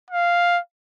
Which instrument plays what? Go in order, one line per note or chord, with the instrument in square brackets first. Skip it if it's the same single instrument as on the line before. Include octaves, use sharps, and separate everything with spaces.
[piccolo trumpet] F5